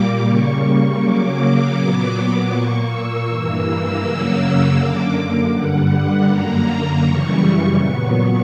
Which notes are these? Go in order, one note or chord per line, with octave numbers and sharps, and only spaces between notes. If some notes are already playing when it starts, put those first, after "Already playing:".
Already playing: A#2 G3 A#3 D6
C#3 G3 A#3 C#6
C#3 F#3 A#3 D6
A#2 F#3 B3 D6
A#2 A#3 C#6
E6
G2 E3 A#3 E6
F#2 C#3 F#3 A#3
F#2 D3 A#3 D6
G2 D3 G3 F#5
F#2 D3 A#3 A#5
F#2 C#3 E3 G3 C#6
A#2 F#3 B3